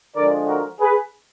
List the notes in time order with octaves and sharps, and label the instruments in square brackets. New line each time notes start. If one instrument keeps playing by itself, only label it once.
[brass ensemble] D3 F3 G#3 A#4 D5
F#4 A#4
G#4 B4